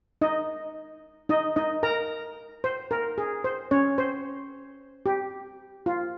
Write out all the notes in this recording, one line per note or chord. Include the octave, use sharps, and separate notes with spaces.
D#4 D#5
D#4 D#5
D#4 D#5
A#4 A#5
C5
A#4
G#4
C5
C#4 C#5
C5
G4
F4